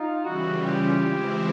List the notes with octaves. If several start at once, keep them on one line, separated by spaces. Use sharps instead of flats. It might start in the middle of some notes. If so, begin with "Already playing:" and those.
Already playing: D#4 F4
C#3 E3 G3 E4 F#4
F4 G4
E3 G#3 C4 E4